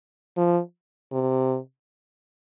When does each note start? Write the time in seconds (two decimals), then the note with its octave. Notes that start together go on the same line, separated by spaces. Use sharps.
0.37 F3
1.12 C3